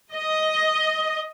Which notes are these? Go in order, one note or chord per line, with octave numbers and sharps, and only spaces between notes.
D#5